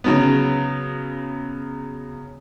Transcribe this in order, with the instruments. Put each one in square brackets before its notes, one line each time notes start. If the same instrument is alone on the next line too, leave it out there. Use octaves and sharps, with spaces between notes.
[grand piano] C#3 F#3 B3